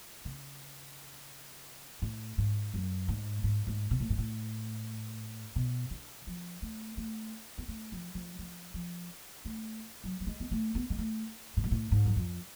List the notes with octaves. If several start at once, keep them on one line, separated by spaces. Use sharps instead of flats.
C#3
A2
G#2
F#2
G#2
G#2
G#2
B2
A2
G#2
A2
B2
D3
F3
A3
A3
B3
A3
F3
F3
F3
F3
A3
F#3
F#3
G#3
B3
A3
B3
G#3
A3
A2
G#2
A2
G#2
F#2
F2